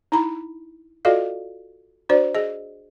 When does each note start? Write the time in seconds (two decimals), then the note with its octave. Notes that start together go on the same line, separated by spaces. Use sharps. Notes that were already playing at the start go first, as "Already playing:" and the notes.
0.12 D#4 E4 A#5 B5
1.05 F4 F#4 A4 D5 D#5 F5
2.09 D4 F#4 C5 D5
2.35 G#4 D#5